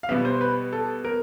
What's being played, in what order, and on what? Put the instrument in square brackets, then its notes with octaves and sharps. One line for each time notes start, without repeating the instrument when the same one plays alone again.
[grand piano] F5
B2 G3 B3 E5
C5
B4
A4
A#4